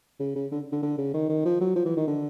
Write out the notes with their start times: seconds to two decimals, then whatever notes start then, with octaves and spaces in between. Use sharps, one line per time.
0.20 C#3
0.36 C#3
0.51 D3
0.72 D3
0.82 D3
0.98 C#3
1.14 D#3
1.29 D#3
1.45 F3
1.60 F#3
1.75 F3
1.86 E3
1.97 D#3
2.07 D3